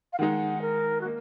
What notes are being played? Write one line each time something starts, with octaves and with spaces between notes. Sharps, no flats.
F5
D#3 G#3 D#4 F#5
A#4
F#4
A#3